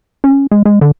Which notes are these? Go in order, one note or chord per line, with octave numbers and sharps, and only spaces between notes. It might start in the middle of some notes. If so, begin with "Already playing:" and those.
C#4
G#3
G#3
D3